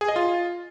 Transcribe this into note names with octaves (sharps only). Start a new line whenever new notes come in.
G#4
D#5
F4